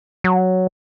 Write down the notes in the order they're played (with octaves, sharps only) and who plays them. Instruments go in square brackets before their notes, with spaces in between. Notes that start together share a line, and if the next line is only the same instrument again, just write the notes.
[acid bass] F#3